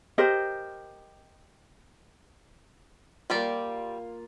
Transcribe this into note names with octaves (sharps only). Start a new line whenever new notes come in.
G4 A#4 C5 D#5
G3 A#3 F4 G4 D5